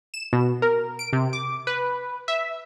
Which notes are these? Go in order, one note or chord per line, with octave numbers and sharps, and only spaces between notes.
E7
B2
A#4
D7
C3
D6
B4
E5